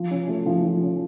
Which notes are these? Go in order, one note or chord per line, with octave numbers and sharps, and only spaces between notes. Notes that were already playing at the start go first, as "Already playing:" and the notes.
Already playing: F3
C#4
A3
F3
F3
C#4